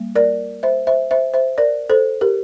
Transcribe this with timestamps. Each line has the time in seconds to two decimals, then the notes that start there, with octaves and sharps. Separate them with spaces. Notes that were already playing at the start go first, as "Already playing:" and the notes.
Already playing: G3 A#3
0.15 A#4 D5
0.63 C5 E5
0.87 C5 E5
1.11 C5 E5
1.34 C5 E5
1.58 A#4 D5
1.90 A4 C5
2.21 G4 A#4